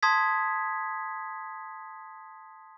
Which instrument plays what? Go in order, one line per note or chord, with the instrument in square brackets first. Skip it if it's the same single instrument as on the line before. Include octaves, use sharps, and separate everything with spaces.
[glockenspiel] A5 C6 D#6 G#6 B6